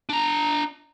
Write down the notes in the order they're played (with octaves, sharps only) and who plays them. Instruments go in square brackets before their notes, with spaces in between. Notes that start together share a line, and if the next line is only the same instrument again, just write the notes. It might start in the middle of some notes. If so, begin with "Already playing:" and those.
[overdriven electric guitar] D4 A#5